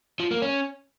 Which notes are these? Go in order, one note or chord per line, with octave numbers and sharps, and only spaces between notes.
F3
A#3
C#4